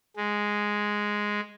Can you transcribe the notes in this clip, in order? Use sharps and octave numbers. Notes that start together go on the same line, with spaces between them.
G#3